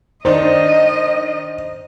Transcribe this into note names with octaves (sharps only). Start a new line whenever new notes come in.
D#3 D4 D#4 C5 D#5